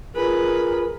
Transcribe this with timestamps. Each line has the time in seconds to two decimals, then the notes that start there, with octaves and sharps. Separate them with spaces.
0.16 F4 G#4 A#4 B4